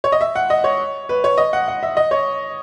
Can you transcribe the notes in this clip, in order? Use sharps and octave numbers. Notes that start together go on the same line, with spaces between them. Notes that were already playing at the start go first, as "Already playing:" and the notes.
C#5
D#5
E5
F#5
D#5
C#5
B4
C#5
D#5
F#5
F#5
E5
D#5
C#5